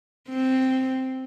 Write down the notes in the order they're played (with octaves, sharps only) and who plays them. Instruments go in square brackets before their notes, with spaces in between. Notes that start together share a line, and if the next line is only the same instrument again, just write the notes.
[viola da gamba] C4